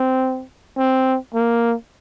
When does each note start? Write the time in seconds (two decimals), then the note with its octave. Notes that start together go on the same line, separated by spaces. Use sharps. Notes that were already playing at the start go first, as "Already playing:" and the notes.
Already playing: C4
0.77 C4
1.35 A#3